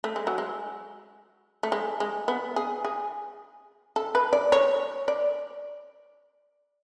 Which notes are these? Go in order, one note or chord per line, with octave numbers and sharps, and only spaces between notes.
A3
G#3
F#3
G#3
A3
G#3
G#3
B3
G#4
G#4
A4
B4
D5
C#5
D5